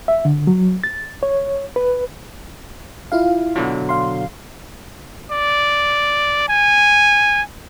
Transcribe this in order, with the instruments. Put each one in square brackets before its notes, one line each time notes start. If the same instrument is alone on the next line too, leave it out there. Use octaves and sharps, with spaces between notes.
[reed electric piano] E5
D3
F#3
A6
C#5
B4
[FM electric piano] E4 F4 F5
[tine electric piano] B2 D3 F#3
[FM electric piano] F5 C6
[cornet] D5
G#5